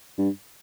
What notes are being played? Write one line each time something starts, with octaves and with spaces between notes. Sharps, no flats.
G2